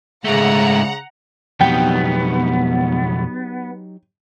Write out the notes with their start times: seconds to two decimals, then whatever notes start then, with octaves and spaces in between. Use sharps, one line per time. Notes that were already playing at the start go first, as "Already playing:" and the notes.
0.25 G#2 C#3 G#3 A3 F#5 A#5
1.61 F2 B2 F#3 B3 D#4 G4 G5